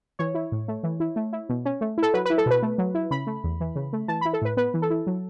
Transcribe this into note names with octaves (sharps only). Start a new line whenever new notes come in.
E3 C#5
E4
A2
A3
E3
E4
A3
E4
B2
C#4
A3
E4 A4
F#3 B4
E4 B4
A4
B2 B4
A3
F#3
E4
C#3 B5
A3
E2
E3
C#3
A3
E3 A5
E4 B5
A4
A2 B4
B3 B4
E3
A4
E4
F#3